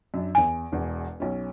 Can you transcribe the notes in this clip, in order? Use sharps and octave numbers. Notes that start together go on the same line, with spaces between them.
F#2 D4
E2 G#5 D7
E1 E2
B1 C#4